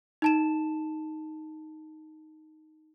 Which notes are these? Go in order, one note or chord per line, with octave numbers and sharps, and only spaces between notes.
D#4 A5 E7